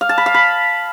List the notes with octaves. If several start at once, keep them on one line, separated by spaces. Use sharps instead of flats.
F5
A5
B5
F5
B5